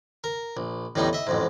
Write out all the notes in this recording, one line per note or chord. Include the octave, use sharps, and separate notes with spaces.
A#4
A#1
A1 E2 A2 G3 D#4
D#5 E5
A1 F2 G#2